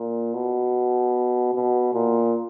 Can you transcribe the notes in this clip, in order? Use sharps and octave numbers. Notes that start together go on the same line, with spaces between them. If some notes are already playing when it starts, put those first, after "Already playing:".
Already playing: A#2
B2
B2
A#2